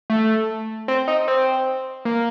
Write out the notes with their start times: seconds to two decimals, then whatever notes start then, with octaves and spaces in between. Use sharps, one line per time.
0.10 A3
0.88 C4
1.08 D#4
1.28 C4
2.05 A#3